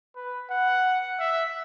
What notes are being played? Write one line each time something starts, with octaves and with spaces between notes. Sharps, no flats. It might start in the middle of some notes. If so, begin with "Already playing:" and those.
B4
F#5
E5